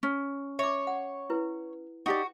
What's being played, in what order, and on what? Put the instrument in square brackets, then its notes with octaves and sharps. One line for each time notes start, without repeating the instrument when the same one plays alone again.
[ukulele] C#4
[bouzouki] C#5 [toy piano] E5 D6
[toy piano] F#5
E4 B4
[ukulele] D#4 G4 D5 [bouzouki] F#4